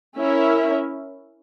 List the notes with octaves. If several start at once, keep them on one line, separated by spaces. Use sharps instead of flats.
C#4 E4 A#4 E5